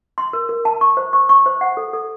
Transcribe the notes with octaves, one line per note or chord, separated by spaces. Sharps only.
C6
A#4
A#4
A5
C#6
C5
C#6
C#6
C5
F#5
A4
A4